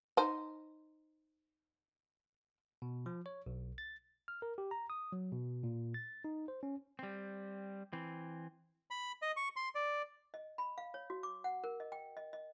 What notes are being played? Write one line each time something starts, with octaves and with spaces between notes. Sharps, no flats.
D#4 C5
B2
F3
C#5
B1
A6
F6
A#4
G4
A#5
D#6
F#3
B2
A#2
A6
D#4
C5
C#4
G3 C4
E3 C4
B5
D#5
C#6
C6
D5
D#5
B5
F5
C#5
F#4
D6
F#5
A#4
D#5
G5
D#5
D#5